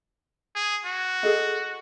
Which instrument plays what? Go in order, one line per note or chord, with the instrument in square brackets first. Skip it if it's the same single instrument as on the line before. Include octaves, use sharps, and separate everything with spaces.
[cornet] G#4
F#4
[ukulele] G#4 A4 D#5